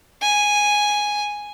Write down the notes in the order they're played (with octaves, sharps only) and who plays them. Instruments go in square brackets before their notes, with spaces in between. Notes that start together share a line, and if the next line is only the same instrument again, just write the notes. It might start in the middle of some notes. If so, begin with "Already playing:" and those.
[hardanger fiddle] G#5